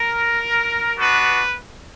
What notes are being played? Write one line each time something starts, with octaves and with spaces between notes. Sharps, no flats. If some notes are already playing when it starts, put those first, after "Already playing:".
Already playing: A#4
B3 D4 F#4 B4